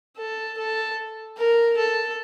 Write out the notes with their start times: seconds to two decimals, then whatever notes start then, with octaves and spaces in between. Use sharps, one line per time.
0.17 A4
0.57 A4
1.37 A#4
1.77 A4